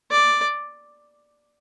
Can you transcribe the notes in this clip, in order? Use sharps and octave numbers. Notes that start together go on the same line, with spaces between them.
D5